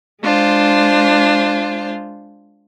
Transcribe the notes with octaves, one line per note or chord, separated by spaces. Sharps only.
G#3 D4 F4 C5